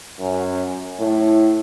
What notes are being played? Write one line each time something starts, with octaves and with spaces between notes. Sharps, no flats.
F#2
A2